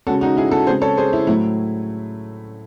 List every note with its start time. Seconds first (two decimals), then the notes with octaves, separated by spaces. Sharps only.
0.07 C#3 G#3 C#4 F#4 A4
0.21 D#4 F#4
0.37 E4 G#4
0.51 F#4 A4
0.67 C#3 G#3 C4 G#4 C5
0.82 A4 C#5
0.97 G#4 C5
1.13 E4
1.27 A2 F#3 A3 E4